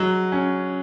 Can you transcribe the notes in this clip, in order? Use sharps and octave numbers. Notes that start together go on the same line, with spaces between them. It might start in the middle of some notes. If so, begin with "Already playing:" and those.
Already playing: F#3 G#3
C#4